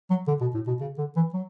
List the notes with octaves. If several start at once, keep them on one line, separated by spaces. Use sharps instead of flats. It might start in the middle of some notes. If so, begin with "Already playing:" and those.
F#3
D3
B2
A2
B2
C#3
D3
E3
F#3